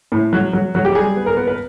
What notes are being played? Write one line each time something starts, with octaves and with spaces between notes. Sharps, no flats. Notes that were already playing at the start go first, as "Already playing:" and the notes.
A2
F#3
F#3
F#3
G4
G3 G#4
B3
A#4
B3
B4